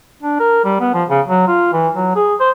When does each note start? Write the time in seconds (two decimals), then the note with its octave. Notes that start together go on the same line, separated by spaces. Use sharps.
0.23 D4
0.39 A#4
0.65 G3
0.80 B3
0.94 F3
1.10 C#3
1.27 F#3
1.47 F4
1.73 E3
1.95 F#3
2.15 G#4
2.40 C5